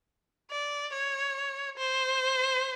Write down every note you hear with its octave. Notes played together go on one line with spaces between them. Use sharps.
D5
C#5
C5